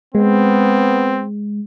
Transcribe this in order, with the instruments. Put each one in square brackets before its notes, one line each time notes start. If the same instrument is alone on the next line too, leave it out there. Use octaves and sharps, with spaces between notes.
[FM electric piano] G#3 [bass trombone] B3 [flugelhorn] C4